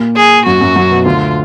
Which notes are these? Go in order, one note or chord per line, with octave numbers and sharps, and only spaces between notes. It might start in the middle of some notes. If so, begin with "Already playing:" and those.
Already playing: A#2 A#3
G#4
F#2 F#3 F#4
F#2 F#3
F#2 F#3
B2
D2 D3 F4